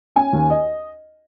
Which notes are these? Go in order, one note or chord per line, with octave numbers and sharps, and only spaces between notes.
C#4 G#5
D#2
D#5